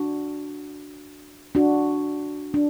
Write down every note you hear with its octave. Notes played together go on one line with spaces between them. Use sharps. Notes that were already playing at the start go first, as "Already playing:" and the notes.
Already playing: D4 F#4
D4 F#4
D4